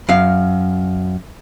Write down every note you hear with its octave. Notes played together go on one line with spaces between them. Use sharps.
F#2 F5